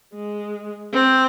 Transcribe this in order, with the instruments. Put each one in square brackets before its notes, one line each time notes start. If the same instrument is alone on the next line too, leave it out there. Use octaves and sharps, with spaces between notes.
[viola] G#3
C4